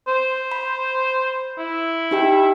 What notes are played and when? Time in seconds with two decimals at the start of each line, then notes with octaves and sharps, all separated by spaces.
0.08 C5
0.52 B5
1.58 E4
2.11 D#4 G4 G5